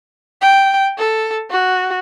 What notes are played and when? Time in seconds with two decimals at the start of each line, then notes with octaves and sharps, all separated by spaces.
0.42 G5
0.98 A4
1.50 F#4